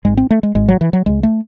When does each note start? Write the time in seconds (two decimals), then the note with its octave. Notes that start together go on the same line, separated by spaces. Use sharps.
0.05 G#1 G#2 G#3
0.17 C4
0.30 A3
0.43 G#3
0.55 G#1 G#2 G#3
0.68 F#3
0.81 E3
0.93 F#3
1.06 C#2 C#3 G#3
1.23 A3